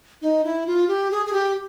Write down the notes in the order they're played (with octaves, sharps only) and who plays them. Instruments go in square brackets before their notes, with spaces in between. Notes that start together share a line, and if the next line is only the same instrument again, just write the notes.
[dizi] D#4
E4
F4
G4
G#4
G#4
G4